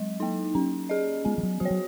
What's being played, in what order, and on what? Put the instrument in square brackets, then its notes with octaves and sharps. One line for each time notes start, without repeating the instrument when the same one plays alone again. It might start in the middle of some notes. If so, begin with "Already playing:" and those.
Already playing: [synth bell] F#3 [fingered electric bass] G#3
[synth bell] A#3 D#4
[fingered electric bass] F#3 [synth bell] C#4
[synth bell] G#4 D#5
[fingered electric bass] G#3 [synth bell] B3
[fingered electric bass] F3
F#3
[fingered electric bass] F#3 [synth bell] F#4
[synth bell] C#5
[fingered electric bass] F#3